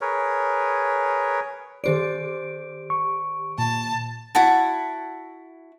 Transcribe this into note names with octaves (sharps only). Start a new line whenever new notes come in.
G#4 A#4 B4 C#5
D#3 G4 C5 D5 D7
C#6
A#2 A5
E4 F#4 A5